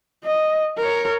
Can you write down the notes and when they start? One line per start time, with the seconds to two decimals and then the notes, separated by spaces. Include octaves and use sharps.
0.24 D#5
0.78 A#4 C#5